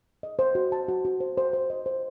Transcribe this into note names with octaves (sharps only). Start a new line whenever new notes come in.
D#5
C5
F#4
A5
F#4
F#4
C5
C5
C5
D#5
C5